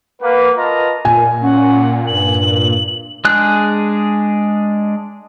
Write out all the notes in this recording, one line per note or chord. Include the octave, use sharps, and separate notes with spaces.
A#3 B4 F#5
F4 A#4 B4 D#5 A5 A#5
A#2 G#5
C#4 F#5
G2 F#7
G#3 D4 G#4 F#6